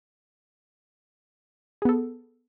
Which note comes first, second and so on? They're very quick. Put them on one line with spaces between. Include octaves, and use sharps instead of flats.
G#4 B3 A4